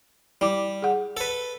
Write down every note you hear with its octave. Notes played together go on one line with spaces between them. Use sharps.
G3 E4 D6
G#4 F#5
A4 B4